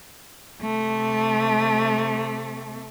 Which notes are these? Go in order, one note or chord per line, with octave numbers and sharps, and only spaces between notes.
C3 A3